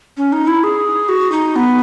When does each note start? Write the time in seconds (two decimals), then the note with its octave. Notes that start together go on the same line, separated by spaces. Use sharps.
0.17 C#4
0.32 D#4
0.47 E4
0.64 G#4
1.09 F#4
1.32 D#4
1.56 B3